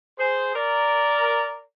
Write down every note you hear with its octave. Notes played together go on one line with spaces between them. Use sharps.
G#4 C5
A#4 D5